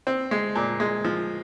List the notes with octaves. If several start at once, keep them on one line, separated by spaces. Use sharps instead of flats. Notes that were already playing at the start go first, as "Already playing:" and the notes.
C4
G#3
A#2
G#3
F3